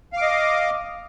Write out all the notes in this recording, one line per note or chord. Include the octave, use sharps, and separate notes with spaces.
D#5 F5 D6